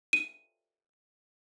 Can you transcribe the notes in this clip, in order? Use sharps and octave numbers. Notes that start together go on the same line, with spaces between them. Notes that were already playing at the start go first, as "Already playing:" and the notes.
D#7